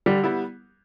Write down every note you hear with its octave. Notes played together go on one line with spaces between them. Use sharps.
D3 G3
G3 B3 E4